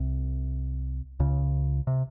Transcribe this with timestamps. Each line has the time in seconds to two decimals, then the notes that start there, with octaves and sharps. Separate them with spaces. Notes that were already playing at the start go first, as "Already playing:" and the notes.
Already playing: C2 C3
1.20 C#2 C#3
1.87 C3